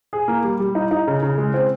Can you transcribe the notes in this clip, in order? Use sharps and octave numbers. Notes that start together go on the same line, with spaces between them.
G#4
A#3
G3
G3
D#4
D#4
C#3
C#3
G#3
C4